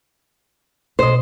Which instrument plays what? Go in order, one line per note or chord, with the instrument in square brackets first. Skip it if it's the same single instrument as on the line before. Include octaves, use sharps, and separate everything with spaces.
[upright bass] B2 [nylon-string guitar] C5 D#5